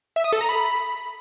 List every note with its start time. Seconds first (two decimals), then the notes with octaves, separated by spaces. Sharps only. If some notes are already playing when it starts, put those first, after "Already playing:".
0.16 E5
0.24 D#6
0.33 A4
0.41 A#5
0.49 B5